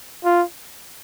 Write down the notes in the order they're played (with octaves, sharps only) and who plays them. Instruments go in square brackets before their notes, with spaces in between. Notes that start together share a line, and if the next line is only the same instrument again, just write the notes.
[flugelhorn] F4